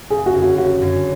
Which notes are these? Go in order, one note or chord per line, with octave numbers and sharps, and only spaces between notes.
F#1 G#4
F#4
F#2 D3
F#4
F#1 F#4
F#2 D3